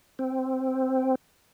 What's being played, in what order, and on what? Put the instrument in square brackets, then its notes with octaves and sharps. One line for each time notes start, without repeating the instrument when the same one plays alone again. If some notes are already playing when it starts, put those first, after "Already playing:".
[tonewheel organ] C4